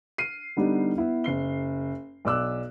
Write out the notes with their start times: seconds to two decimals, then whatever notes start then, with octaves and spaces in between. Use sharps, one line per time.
0.18 F6 C7 D#7
0.57 D3 G3 B3 D4 D#4 G4
0.98 B3 E4
1.24 F#1 C7 G7
2.25 B1 D5 D6 E6 F#6